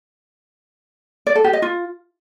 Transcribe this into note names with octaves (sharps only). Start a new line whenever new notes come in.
D5
A4
G4
D#5
F4